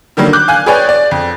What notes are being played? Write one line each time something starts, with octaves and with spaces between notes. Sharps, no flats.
D3 D#3 F#3 G3 A#3
D6 F#6 G6
F5 G#5 F#6
G#4 B4 C#5 D5 G5 G#5
D5
F2